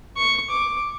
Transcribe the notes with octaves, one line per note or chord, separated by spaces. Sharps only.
C#6
D6